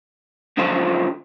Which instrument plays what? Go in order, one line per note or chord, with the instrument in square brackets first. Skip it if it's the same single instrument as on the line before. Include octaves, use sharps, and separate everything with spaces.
[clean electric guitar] C#2 F#2 D3 F3 F4 C5